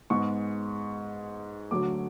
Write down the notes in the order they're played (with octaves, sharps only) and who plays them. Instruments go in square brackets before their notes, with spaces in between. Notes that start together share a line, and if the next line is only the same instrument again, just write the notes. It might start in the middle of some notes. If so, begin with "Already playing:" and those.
[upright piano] G#2 G#3 B3 C#6
D2 D3 F#3 A3 D6